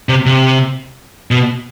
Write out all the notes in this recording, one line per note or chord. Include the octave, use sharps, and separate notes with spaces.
C3
C3
B2